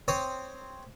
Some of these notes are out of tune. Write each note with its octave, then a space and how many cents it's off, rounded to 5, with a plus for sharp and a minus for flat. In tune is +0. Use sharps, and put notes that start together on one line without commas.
C4 +0 C#5 +0 D#6 +0